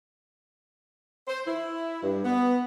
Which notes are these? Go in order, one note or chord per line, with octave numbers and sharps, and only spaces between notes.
C5
E4
G2
B3